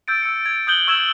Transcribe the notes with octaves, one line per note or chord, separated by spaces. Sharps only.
E6 G6 A6 D7
E6 C#7
G#6
D#6 F#6 G6 F#7 G7
C#6 E6 G#6 E7 F#7